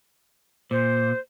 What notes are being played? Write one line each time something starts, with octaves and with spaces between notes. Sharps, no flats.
A#2 C5